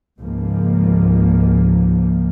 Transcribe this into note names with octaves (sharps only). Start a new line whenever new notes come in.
C#2 G#2 F3 A#3